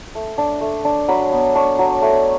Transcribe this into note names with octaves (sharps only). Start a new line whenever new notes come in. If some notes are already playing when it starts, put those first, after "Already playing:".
A3
D4
A3
D4
F#3 B5
B3
D4 C#6
F#3
A3